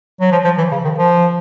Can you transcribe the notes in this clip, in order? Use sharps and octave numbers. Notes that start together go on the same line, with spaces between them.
F#3
F3
F3
E3
C#3
D#3
F3